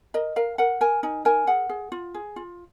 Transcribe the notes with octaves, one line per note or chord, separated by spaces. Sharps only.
A#4 D#5
A#4 F5
A#4 F#5
A#4 G#5
D#4 G#5
A#4 G#5
G#4 F#5
G#4
F4
G#4
F4